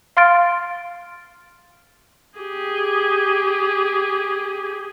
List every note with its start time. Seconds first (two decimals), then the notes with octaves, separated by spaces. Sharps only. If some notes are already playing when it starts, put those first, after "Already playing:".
0.17 F5 C6 F6 A6 D7
2.39 G4 G#4